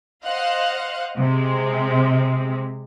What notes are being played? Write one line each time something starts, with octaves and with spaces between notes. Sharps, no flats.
C5 D#5 F5 F#5
C3 G#3 C4